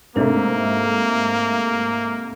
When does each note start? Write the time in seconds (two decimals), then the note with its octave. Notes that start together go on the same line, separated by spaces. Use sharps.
0.16 G#2 C3 A3 A#3 C4 D4 A#4